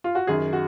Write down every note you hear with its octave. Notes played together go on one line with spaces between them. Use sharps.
F4
F#4
F#2 D#3 G#4
F#4